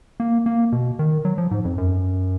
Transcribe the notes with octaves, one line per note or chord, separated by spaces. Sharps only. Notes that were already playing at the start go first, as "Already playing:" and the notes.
A#3
A#3
B2
D#3
F#3
F3
G#2
F2
F#2